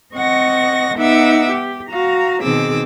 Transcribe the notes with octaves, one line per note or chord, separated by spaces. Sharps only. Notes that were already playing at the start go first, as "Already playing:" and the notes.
C4 D#5 F#5 C#6 A#6
B3 D#4 E5 F#5 D6 E6
G4
F#4 F5 A#5
B2 D#3 C4 G#4 D6 E6